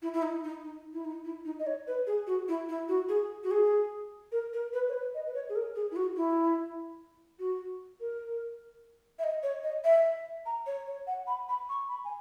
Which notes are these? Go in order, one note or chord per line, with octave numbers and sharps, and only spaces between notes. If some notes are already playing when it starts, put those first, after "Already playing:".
E4
E4
D#4
D#4
D#4
E4
D#4
E4
D#4
D#5
C#5
B4
G#4
F#4
E4
E4
F#4
G#4
F#4
G#4
A#4
A#4
B4
C#5
B4
D#5
B4
C#5
G#4
A#4
G#4
E4
F#4
E4
F#4
A#4
E5
D#5
C#5
D#5
E5
A#5
C#5
C#5
F#5
B5
B5
C#6
B5
G#5